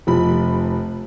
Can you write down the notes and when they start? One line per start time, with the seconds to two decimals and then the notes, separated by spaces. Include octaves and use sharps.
0.07 F1 F3 B5